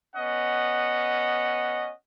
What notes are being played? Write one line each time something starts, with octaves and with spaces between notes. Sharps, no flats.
B3 C#4 D#5 F#5